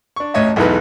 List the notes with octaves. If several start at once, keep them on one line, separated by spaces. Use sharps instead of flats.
D4 C#6
A1 D2 C#5 D#5 E5
B1 E2 E3 A3 D#4 B4